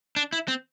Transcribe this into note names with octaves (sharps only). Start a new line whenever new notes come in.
D4
E4
C4